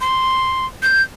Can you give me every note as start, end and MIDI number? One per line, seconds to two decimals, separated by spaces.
0.01 0.66 84
0.83 1.02 91